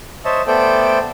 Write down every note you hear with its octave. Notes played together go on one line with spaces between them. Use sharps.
C5 C#5 D#5 E5 A5
A3 B3 A4 C5 D5 G5